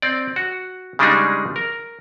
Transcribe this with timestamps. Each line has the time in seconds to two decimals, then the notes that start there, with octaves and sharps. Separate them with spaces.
0.02 C4 D5
0.36 F#4
0.99 C#3 G3 G#3 D4 D#4 G#4
1.56 A#4